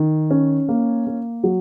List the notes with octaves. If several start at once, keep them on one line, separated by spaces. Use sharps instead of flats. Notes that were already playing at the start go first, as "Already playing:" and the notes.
Already playing: D#3
C#4
A#3
A#3
F#3